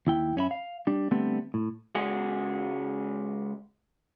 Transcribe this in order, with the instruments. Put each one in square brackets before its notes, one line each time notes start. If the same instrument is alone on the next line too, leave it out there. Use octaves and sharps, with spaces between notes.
[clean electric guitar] D#2 E4 G5
F#2 C#4 F4 E5 B5
F5
G3 D4
D3 G3 A3 B3 C4
A2
C#2 G#3 F#4 G#4